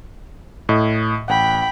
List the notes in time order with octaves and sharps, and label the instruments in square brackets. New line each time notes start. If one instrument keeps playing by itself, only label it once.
[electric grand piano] A2 D#5
[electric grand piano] A1 F#5 [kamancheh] G5 B5